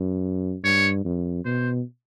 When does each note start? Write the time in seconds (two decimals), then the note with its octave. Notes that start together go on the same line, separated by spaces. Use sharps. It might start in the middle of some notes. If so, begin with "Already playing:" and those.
Already playing: F#2
0.64 G2 C#5
1.05 F2
1.45 B2 C5